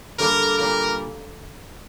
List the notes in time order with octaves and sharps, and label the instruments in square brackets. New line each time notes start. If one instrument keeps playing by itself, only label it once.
[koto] D3 G3 A#3 D4 [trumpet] A#4
[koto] A#2 G3 A#3 [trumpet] A#4